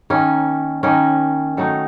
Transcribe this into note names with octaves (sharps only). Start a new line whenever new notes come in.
D#3 A#3 C#4
D#3 A#3 C#4
D#3 F#3 A3 D#4